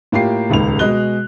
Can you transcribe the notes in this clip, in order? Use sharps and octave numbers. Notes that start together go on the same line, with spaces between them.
A2 A#3 F4 G4 C7
D#1 C#2 G#2 F7
B2 G#3 D#5 F#6 G7